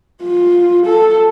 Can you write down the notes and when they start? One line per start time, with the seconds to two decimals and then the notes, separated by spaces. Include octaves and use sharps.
0.23 F4
0.87 A4